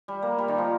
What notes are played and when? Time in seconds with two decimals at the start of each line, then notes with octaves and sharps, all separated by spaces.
0.08 G3
0.22 A#3
0.39 G3
0.48 D#3
0.58 F3